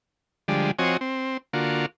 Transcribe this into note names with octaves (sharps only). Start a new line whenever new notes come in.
D3 F3 G3 G#3
F3 C4 F#4 C#5 D#5 G#5
C4
D3 A#3 F4 F#4